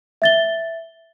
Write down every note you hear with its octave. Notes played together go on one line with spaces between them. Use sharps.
E5 A6 G7